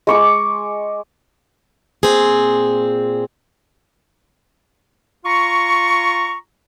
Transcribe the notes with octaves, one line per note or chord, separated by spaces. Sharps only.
G#3 C#6 D6
A#2 C4 G#4
F4 A#5 C#6